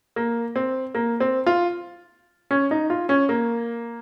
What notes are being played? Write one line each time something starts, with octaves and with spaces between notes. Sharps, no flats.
A#3
C4
A#3
C4
F4
C#4
D#4
F4
C#4
A#3